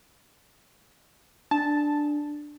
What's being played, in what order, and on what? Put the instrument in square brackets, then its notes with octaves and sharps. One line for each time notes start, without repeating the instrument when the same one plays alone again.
[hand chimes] D4 [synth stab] A5